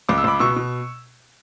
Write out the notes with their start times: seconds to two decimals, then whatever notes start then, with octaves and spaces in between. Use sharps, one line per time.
0.09 C#2 D6
0.18 E6
0.24 C#2 B5 D6
0.40 B2 C#6 E6
0.56 B2